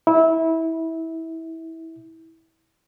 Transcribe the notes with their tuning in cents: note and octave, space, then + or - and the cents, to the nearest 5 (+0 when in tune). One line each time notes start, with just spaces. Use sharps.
E4 -20